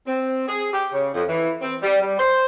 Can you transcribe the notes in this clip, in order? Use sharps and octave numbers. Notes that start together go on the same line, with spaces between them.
C4
G#4
G4
C#3
F2
E3
C4
G3
G3
C5